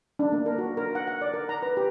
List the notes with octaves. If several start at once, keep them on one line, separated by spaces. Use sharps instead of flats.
D4
A#3
A#4
F#4
A#4
F#5
F#5
D5
A#4
A#5
B4
G4